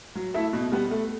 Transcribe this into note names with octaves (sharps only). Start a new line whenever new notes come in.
F#3
A3 E4 A4 E5
B2
G3 B3
A3